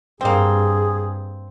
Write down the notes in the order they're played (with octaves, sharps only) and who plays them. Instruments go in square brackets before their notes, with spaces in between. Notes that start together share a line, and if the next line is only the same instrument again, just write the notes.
[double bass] G2 [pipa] A#3 C4 [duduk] G#4